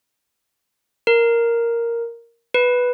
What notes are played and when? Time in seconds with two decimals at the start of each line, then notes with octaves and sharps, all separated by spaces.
1.07 A#4
2.54 B4